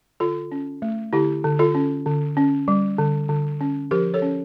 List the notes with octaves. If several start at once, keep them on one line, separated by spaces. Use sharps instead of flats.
D3 F4 A4
C#4
A3
D3 E4 G4
D3
F4 A4
C#4
D3
C#4
G3
D3
D3
C#4
F3 G4 A#4
A4 C#5
C#4